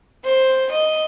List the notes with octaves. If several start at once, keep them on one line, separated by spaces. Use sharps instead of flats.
C5
D#5